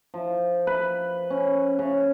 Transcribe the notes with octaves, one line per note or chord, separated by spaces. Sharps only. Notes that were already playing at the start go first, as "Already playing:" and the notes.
F3
B4
C#4
C#3